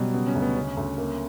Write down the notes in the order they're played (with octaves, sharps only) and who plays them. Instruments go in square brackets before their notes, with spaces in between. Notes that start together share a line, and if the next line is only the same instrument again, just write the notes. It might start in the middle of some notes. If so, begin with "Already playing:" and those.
Already playing: [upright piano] B2 [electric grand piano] F#3 G3
[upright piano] C#3 [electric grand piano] B3
[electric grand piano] C#4
[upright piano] D2
[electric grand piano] B3
[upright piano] C#3 [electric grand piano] C#4
[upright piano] D2
A#3